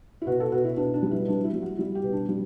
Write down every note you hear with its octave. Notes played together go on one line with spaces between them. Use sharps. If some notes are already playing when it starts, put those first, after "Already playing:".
E4
B2 F#4
A4
B2 F#4
E4
B2 D4
D4
G3
E4
G3 D4
E4
G3
F#4
G3 E4
G4
B2
D4
G3